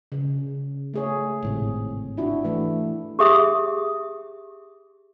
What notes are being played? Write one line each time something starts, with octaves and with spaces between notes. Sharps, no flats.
C#3
A3 G#4 C#5
G#1 A2 C3
D4 E4 F#4
E3 A3
G4 G#4 E5 D#6